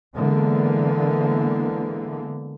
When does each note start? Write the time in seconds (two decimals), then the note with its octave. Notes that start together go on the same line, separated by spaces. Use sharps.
0.14 D3 E3 G#3 A#3 B3